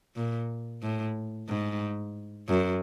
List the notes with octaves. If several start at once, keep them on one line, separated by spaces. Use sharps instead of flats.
A#2
A2
G#2
F#2